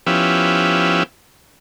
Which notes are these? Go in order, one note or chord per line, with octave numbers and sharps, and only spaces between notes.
F3 B3 C#4 E4 G4